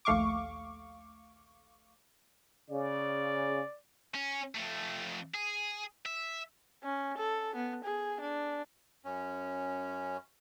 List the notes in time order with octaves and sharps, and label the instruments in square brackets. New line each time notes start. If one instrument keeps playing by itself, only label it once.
[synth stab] A#1 D#2 A3 F5 C#6 D6
[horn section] C#3 [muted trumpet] D5
[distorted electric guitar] C#4
F2 A3
G#4
E5
[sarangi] C#4
A4
B3
G#4
D4
[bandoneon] F#2 C#4